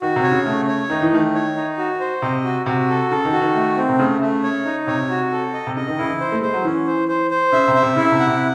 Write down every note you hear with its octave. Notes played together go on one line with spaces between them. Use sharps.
D#3 F#4
C3
C#5
C#3
C#3 A3
C#5
D#3 D#4
E3
D#3 A3
C#5
D#4
F#4
C5
C3 D#5
F#4
C3 F#4
A4
C#3 A4
D#3
F#4
D#3
A3
C4
C3
C#3 A3
A3
C#5
D#4
C3 C#5
F#4
A4
D#5
C3
C#3 D#5
D#3
C#3 E4
E3
C5
A3
G#3 C5
F#3
E3 C#4
C5
C5
C5
C#3 E5
C3
E5
C3
C#3 E4
C3
F#5
C3